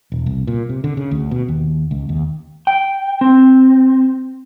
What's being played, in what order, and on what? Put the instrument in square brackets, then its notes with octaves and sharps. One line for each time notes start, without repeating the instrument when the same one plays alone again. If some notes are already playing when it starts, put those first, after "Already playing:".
[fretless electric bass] E1
C2
A#2
C3
D3
C#3
D2
B2
D#2
C#2
D#2
[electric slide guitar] G5
C4